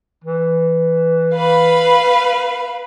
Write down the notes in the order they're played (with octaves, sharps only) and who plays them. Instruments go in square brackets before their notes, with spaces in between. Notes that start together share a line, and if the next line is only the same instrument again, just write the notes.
[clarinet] E3
[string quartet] B4 F5 B5